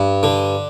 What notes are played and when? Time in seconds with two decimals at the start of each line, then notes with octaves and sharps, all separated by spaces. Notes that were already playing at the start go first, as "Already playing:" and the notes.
Already playing: G2
0.23 D3